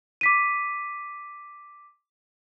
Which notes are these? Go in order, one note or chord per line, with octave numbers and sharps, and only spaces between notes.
D6 B6 D#7